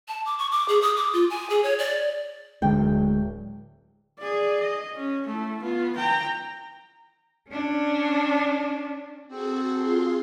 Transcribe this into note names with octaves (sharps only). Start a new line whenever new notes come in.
A5
D6
C#6
D6
G#4
D#6
D6
F4
G#5
G#4
C#5
D5
D1 D3 F#3 G#3 G5
G#4 D5
D#5
C#4
A3 E4
B3 F4
G5 A#5
C#4 D4
C4 F#4 G#4 A4
F4 G#4 C6